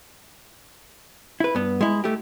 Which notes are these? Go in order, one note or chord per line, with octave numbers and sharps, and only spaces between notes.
E4 B4
G2 B3
G#3 E4
A3 G4